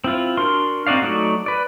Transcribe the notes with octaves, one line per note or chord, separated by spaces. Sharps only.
C4 E4 F4
D4 F#4 A#4 C6
C4 D#4 F#4 D5 F5
F#3 A3 D#4 F#4 D5
B4 D5